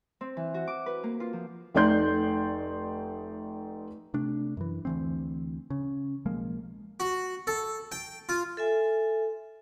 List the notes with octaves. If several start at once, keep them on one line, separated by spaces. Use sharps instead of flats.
C4
E3
F#4
D6
B4
A#3
F4
F3
F1 A3 D#4 D5 C6 G6
C3 A3 D4
F#2 E3
D2 E3 C4
C#3
B1 F3 G#3 A#3
F#4
A4
G5
F4
A4 E5 G#5